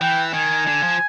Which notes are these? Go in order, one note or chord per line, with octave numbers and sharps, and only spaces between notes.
E3 G5
D#3 G#5
D3
F3